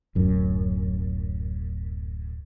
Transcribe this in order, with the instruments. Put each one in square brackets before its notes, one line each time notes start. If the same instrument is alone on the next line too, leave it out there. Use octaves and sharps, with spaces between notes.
[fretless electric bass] D1 F#2